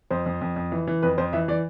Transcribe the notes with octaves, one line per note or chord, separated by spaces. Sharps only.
F2 C5
F2
F2
F2
E3
E3
F2 B4
F2 C5
E3 E5
E3 D5